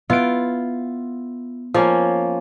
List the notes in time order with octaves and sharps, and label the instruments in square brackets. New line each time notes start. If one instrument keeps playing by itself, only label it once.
[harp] B3 D7 [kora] E4 F4
[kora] F3 A#3 C#4